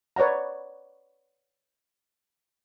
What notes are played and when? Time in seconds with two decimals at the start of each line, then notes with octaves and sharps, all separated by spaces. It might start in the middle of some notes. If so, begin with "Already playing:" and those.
0.16 B4 C#5 D5 F#5 A#5